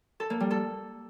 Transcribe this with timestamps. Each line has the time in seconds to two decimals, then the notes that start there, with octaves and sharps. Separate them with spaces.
0.20 A4
0.30 A#3
0.40 G3
0.51 A4